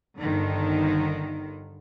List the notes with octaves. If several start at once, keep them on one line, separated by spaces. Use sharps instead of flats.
G1 D3 D#3